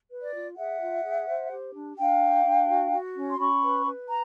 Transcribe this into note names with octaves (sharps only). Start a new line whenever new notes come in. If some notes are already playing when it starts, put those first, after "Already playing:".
B4
D5
F4
G#4 E5 F#5
F4
G#4
C5
G4
D4
D4 F5 G5
G4
D4
F#4
F#4
C#4
C6
C#4 B5 C#6
B4
B4
A#5